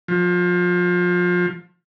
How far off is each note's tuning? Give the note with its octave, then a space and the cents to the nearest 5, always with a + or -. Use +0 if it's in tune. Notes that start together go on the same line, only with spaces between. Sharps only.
F3 +30